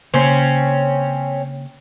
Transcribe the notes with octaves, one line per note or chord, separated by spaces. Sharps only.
C#3 A#3 C4 C#4 C6